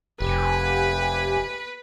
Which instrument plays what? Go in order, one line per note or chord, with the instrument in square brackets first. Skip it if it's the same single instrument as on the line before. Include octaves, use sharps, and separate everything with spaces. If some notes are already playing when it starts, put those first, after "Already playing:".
[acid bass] F1 [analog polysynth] G4 G#5 [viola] B4